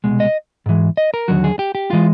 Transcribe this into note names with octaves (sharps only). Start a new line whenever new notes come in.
C2 B2 G#3
D#5
G#2 E3 G#3
D#5
A#4
D#2 D3 F#3 F#4
G#4
G4
G4
E3 G#3 F4